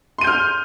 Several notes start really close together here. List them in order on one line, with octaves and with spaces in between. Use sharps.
C6 D#7 G6 F6